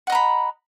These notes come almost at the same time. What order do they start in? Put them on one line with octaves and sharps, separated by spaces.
F#5 D#5 A#5 B5